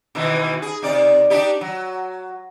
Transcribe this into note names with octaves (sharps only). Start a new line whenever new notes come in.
B2 D#3 E3
G#4
C3 D#4 D5
D4 D#4 G4
F#3